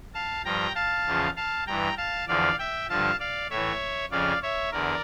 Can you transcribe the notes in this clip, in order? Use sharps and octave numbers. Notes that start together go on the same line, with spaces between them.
F5 A5
G2 F3 G5 A#5
F5 A5
E2 C#3 F3
F5 A5
G2 E3 G5 A#5
F5 A5
E2 D3 F3 D5 F5
E5 G5
G2 D3 F3 F5 A5
D5 F5
A2 E3 C#5 E5
F2 C#3 F3 D5 F5
C#5 E5
E2 D3 A#4 D5